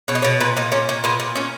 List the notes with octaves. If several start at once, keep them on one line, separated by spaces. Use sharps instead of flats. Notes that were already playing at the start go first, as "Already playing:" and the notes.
B2 C#5
D#5
B2 C#5
A#2 B4
A#2 D#4
A#2 C#4
A#2 C#4
A#2 B3
A#2
A#2 C#4